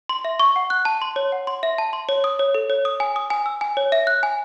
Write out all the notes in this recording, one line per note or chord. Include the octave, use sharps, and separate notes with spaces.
C6
E5
C#6
F#5
F#6
A5
C6
C#5
F#5
C6
E5
A5
C6
C#5
D#6
C#5
A4
C#5
D#6
G#5
D#6
G#5
E6
G#5
C#5
E5
F#6
G#5